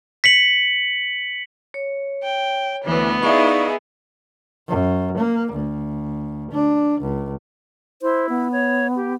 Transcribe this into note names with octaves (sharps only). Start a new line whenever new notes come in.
B6 C#7 F#7
C#5
G5
D2 E3 B3
D#4 E4 G#4 D5 F5 C#6
F#2
A#3
D2
D4
C#2
E4 C5
B3
C#5
G4